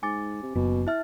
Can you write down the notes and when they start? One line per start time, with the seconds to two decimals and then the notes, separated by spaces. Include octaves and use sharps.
0.03 G#2 G#5 D6 A6
0.43 C3
0.55 F#1 B2
0.87 E4 E5 F6